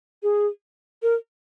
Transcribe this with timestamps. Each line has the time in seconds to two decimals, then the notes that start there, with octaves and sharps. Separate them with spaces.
0.23 G#4
1.03 A#4